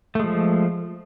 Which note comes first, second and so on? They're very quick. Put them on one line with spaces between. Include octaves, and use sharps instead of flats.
A3 G#3 F3